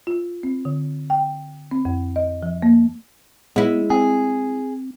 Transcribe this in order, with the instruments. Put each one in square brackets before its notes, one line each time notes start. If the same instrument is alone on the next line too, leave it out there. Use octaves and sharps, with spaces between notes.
[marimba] F4
C4
D3
G5
C4
F2
D#5
F3
A#3
[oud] G#3 E4 [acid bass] B3
[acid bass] C4 [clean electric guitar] G#4